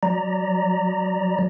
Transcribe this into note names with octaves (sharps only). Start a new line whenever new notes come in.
F#3 D5 A#5